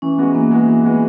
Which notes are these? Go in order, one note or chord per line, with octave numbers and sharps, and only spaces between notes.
E3 C#4
G#3 B3 F#4
E3 A#3
G#3 B3 F#4
E3
G#3 B3 F#4